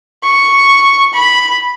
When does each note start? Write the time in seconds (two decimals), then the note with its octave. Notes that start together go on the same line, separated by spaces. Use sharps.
0.23 C#6
1.14 B5